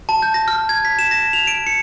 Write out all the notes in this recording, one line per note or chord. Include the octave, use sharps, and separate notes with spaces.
A5
G6
A#6
F6
G#6
B6
E7
A#6
F7
D7
C#7